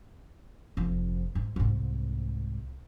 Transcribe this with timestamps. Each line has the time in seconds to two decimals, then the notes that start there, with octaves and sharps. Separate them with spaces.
0.77 F1 F3
1.35 G#2
1.56 C2 G#2